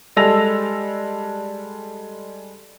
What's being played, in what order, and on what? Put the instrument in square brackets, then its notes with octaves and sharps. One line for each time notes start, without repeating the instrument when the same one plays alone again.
[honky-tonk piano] G3 G#3 A4 E6 A#6 F7